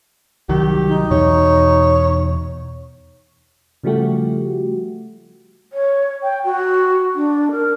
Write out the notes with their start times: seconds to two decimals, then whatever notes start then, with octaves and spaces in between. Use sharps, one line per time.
0.49 C2 D#3 F#3 G4
0.88 D#4
1.11 E2 B2 C#5
3.84 C#3 F3 G3 A3 F#4 G4
5.73 C#5
6.23 G5
6.45 F#4
7.15 D4
7.51 A#4